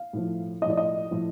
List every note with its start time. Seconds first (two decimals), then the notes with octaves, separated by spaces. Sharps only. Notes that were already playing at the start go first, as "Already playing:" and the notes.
Already playing: F5
0.13 A2 F3
0.62 F3 D#5
0.66 A2 D5
0.77 D#5
1.11 A2 F3